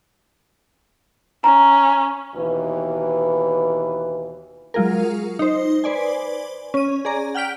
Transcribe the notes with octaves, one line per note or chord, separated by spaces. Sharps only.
C#4 A#5
D#2 B2 E3 B4
F#3 G#3 F4 G#4 A#4
D#4 C5
B4 C5 D5 G#5
C#4 D#7
G#4 D5 A#5
F#5 G5 F6 B6 D7